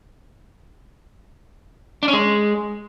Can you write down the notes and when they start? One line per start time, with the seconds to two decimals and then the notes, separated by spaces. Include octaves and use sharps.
2.03 D4
2.08 C#4
2.13 G#3